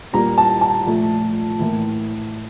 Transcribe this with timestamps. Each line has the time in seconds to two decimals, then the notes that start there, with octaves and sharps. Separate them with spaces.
0.13 A#2 G3 A#3 A#5
0.38 A5
0.61 A5
0.85 A#2 F3 A3
1.59 A2 E3 A#3